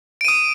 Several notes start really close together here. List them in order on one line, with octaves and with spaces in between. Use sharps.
D7 D#7 D#6